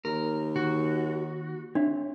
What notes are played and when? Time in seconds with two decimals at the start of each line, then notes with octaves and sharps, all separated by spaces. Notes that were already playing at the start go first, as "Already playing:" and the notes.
0.05 D#2 A#4
0.56 D#3 F#4
1.75 C4 D4 C#5 E5